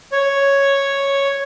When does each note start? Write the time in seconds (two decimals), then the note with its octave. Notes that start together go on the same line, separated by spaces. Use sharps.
0.12 C#5